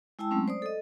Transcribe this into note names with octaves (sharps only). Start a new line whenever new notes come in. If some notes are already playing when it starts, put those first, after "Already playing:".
G#3 E4 G5 A5 E6
F#3 G#3 A3 C4 C#4
C5 D5 D#6
A4 D#5